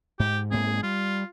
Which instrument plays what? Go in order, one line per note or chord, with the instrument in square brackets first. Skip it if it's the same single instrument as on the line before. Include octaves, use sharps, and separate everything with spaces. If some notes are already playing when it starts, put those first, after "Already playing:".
[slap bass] G#2 [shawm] G4
[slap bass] G#2 A#3 C4 [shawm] G#4
[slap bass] G3 [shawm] F4